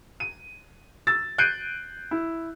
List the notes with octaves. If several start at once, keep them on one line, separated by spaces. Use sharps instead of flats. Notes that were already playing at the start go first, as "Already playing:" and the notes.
D#7
E6 A6
F#6 G6 C7 D7 D#7
E4